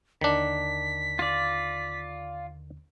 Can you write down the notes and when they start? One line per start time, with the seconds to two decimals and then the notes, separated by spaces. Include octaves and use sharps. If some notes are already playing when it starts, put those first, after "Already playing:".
0.21 D#2 D3 D#3 D4 B6
1.19 F4 D5